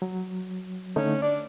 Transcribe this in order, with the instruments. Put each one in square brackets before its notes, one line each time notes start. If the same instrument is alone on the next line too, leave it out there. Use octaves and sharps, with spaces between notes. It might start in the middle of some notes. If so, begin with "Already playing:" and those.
[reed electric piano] F#3
[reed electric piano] D3 A3 D#4 [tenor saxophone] C#4
[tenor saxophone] D4 [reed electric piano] D5